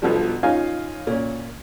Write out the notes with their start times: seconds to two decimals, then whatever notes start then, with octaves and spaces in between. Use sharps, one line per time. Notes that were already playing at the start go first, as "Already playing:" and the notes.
0.02 B1 B2 D3 F3 G3
0.43 C#4 D#4 F4 F5 G#5
1.07 A#2 C#4